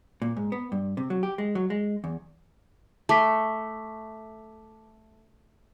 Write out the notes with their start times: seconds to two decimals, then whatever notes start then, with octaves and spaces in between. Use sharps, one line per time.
0.22 A#2
0.37 G#2
0.52 B3
0.72 G2
0.97 C3
1.10 F#3
1.23 G4
1.38 G#3
1.55 F#3
1.70 G#3
2.04 E2
3.09 A3 A5 D6 B6